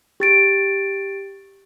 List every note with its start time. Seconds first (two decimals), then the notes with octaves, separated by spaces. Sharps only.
0.20 G4 A6 D7